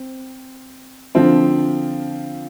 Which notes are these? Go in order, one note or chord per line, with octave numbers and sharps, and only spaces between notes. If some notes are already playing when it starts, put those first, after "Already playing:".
Already playing: C4
D3 F3 C4 F4